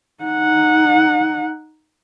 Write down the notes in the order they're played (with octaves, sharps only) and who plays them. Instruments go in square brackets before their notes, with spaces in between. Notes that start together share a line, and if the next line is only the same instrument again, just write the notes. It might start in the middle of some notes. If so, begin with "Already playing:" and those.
[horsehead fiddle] D#4 F#5